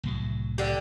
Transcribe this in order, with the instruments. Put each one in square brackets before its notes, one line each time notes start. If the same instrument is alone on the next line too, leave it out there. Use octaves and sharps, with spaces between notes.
[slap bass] C2 A2 F#3
[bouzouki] D3 G4